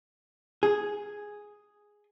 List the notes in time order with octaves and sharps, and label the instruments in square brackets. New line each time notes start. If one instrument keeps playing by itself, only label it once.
[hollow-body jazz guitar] G#4